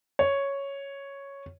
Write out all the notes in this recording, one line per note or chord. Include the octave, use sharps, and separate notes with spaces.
C#5